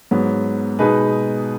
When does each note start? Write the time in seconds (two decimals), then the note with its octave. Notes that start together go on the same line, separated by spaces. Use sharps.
0.11 G#2 F#3 B3
0.79 B2 G#3 D#4 G#4 B4